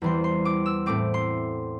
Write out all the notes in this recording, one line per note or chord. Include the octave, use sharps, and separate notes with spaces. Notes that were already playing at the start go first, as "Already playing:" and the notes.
E2 E3 G3 C4 C6
C6
D6
E6
A2 A3 C4 D6
C6